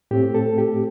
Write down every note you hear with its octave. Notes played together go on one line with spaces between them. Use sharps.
A2 A3 C4 G4
A4
G4